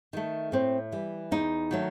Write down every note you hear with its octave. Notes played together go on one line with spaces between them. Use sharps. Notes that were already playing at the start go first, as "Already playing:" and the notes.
D#3 A3
A2 C4
E3 G3
E2 D#4
D#3 F#3 A3